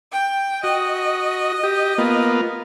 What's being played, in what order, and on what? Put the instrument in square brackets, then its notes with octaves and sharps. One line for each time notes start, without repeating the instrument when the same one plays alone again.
[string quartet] G5
[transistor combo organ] F#4 [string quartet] D#5
[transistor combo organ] G4
A#3 B3 F4